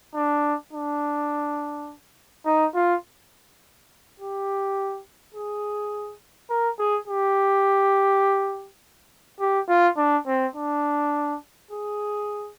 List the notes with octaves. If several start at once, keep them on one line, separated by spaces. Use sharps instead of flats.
D4
D4
D#4
F4
G4
G#4
A#4
G#4
G4
G4
F4
D4
C4
D4
G#4